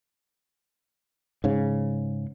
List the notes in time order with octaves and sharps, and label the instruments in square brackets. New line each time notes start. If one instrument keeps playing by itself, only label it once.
[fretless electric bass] G#2 C#3